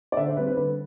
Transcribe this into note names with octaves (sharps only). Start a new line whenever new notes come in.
D5
D3 E5
C5
G3 C4 B4
B4
D3 B4